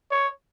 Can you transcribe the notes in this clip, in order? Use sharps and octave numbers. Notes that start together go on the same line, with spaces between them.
C#5